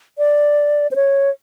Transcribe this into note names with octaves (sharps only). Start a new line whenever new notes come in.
D5
C5
C#5